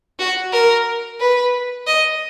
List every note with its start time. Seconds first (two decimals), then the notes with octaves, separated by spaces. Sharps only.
0.19 F#4
0.53 A#4
1.20 B4
1.87 D#5